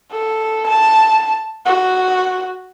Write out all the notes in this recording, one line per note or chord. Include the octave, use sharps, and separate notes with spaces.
A4
A5
F#4